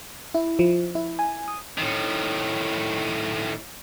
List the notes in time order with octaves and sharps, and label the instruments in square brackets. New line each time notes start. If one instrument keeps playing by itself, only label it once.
[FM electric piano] E4
F3
E4
G#5
D#6
[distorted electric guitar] A2 D#3